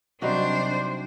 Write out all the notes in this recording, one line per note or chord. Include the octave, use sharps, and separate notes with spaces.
C3 F#3 G3 D4 D#4 F#4 C5